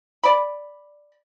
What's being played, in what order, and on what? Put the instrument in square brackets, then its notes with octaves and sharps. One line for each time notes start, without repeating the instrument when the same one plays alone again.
[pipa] D5 B5